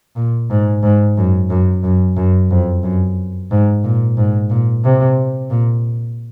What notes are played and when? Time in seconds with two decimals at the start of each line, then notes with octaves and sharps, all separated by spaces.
0.16 A#2
0.50 G#2
0.83 G#2
1.17 F#2
1.50 F#2
1.84 F#2
2.17 F#2
2.51 F2
2.83 F#2
3.51 G#2
3.84 A#2
4.18 G#2
4.50 A#2
4.84 C3
5.51 A#2